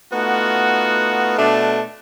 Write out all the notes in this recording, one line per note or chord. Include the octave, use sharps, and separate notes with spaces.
A3 B3 D#4 F4 F#4
B2 A3 D4